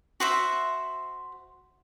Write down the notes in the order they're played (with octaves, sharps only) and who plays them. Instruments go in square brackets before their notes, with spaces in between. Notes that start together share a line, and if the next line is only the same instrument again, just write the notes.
[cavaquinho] F#4 C5 E5